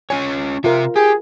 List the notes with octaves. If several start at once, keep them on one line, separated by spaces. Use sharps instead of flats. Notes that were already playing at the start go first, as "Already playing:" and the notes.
C#4 F4 C#5 G#5
C3 F4 A#4 E5
G4 G#4